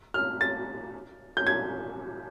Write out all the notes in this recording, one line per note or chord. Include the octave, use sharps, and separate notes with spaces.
F6
A6
G6
G#6